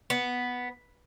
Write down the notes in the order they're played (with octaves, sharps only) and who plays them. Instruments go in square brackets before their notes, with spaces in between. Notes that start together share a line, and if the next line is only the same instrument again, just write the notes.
[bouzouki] B3